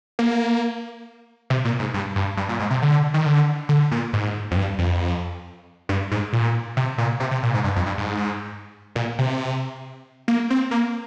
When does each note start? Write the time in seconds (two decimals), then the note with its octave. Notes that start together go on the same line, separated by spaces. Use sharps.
0.19 A#3
1.50 C3
1.65 A#2
1.79 G#2
1.94 G2
2.16 G2
2.37 G2
2.49 A#2
2.59 G#2
2.70 C3
2.82 D3
3.14 D#3
3.26 D3
3.69 D3
3.91 A#2
4.13 G#2
4.51 F2
4.57 G2
4.78 F2
5.89 G2
6.11 G#2
6.33 A#2
6.77 C3
6.98 A#2
7.20 C3
7.31 C3
7.43 A#2
7.54 G#2
7.64 G2
7.76 F2
7.86 G2
7.98 G#2
8.95 A#2
9.19 C3
10.28 A#3
10.50 C4
10.71 A#3